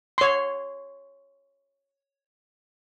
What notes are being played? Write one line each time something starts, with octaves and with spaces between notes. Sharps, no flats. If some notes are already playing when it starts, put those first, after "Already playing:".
C#5 C6